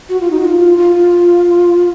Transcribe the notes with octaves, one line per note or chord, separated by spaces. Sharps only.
F#4
F4
D#4
F#4
F4
F4